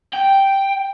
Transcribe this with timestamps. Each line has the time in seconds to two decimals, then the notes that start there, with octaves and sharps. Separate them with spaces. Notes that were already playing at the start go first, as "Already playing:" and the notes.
0.13 G5